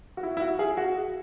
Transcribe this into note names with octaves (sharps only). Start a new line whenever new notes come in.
F#4
E4
E4
F#4
G#4
F#4